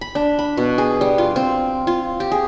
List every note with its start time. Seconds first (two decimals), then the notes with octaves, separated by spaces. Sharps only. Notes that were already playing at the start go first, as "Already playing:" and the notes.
0.01 B5
0.15 D4
0.39 B5
0.57 B2
0.78 G#4
1.01 G3
1.18 F4
1.36 C4
1.87 F4
2.20 G4
2.32 G#4